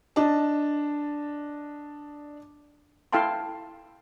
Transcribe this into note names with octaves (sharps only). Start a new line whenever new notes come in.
D4 D#5 A5
E4 A4 F5 G5 A5 C6